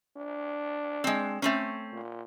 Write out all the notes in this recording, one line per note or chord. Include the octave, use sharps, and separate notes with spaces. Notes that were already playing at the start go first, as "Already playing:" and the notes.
D4
G#3 C4
A3 C4 C#4
A#2